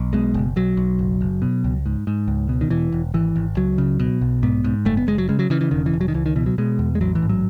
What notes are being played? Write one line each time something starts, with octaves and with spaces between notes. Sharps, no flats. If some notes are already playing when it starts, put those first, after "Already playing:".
Already playing: B1
B2 G#3
F#1
B1 F#3
B1
F#1
F#1
B2
C#2
G#2
G#2
C#2
B2
D#3
E1 E3
E1
G#1 E3
G#1
C#2 F#3
C#3
B2
B1
G#2 B3
G#2
F#1 A3
B3
F#1 G#3
F#3
C#3 G#3
F#3
C#3 E3
E3
E1 D#3
E3
E1
F#3
D#3
C#2 E3
D#3
B2 E3
F#3
B2 G#3
E2
G#3
A1 F#3
E3
G#2
F#3